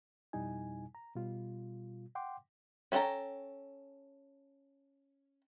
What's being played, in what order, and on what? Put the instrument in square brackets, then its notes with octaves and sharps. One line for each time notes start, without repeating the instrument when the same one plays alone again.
[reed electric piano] F2 B2 G3 D#4 E4 G#5
A#5
B2 G3 F4
F#5 G5 C6 D6
[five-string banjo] C#4 A4 B4 G5 A#5